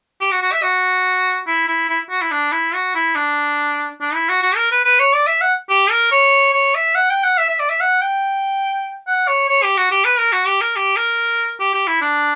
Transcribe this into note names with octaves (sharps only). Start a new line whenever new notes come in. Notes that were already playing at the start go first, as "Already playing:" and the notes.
G4
F#4
F#4
E5
F#4
E4
E4
E4
F#4
E4
D4
E4
F#4
E4
D4
D4
E4
F#4
F#4
A#4
B4
B4
C#5
D5
E5
F#5
G4
A#4
C#5
C#5
E5
F#5
G5
F#5
E5
E5
D5
E5
F#5
G5
F#5
C#5
C#5
G4
F#4
G4
B4
A#4
F#4
G4
A#4
G4
A#4
G4
G4
E4
D4